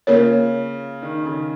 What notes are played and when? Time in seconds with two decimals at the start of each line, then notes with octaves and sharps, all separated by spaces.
0.07 C#3 A#3 F4 A#4 C#5
1.02 D#3
1.26 C#3